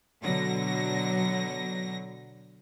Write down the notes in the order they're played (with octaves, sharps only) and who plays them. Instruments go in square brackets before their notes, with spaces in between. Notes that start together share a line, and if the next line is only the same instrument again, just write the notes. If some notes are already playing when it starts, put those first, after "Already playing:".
[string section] B2 D3 F#3 A#6